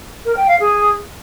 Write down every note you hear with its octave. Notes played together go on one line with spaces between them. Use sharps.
A#4
G5
F5
G#4